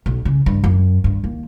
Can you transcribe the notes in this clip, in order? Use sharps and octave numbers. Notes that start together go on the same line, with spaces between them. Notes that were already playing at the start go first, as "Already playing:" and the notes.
B1
C#3
G2
F#2
G2
D#2